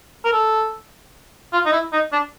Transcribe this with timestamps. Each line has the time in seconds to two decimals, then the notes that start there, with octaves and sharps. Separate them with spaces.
0.25 A#4
0.33 A4
1.53 F4
1.66 D#4
1.72 E4
1.93 D#4
2.13 D4